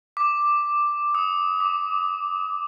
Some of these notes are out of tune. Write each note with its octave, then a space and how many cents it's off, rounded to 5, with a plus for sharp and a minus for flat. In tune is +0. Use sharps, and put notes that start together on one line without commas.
D6 +5
D#6 +35
D6 -10